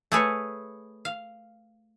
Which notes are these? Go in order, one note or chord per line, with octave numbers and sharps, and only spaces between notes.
A3 G#4 B4 C#5
F5